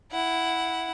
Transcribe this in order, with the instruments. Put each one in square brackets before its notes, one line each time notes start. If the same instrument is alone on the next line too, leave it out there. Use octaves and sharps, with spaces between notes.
[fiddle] E4 F#5